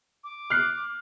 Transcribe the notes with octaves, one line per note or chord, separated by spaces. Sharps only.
D6
F6 F#6 C7